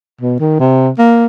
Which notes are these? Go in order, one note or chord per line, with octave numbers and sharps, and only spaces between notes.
B2
D#3
C3
A#3